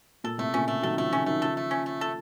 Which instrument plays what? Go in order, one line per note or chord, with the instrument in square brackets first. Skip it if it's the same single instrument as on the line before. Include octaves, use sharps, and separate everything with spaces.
[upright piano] A#2 [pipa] A4
[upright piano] A2 C3 [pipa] A3
[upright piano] A#2 C#3 [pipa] C#4
[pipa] A3
[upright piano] D#3 F#3 [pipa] A4
[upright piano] C#3 F3 [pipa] A3
[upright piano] C#3 F3 [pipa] C#4
[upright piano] D#3 F#3 [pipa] A3
[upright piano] C#3 F3 [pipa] A4
[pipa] A3
C#4
A3
A4